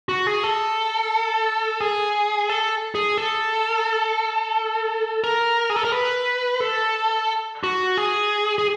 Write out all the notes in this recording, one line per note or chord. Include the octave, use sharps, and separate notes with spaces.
F#4
G#4
A4
G#4
A4
G#4
A4
A#4
G#4
A4
A#4
B4
A4
F#4
G#4
G#4